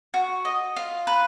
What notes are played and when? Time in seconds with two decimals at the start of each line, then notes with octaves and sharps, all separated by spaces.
0.14 F#4
0.45 D#5
0.76 F4
1.07 B4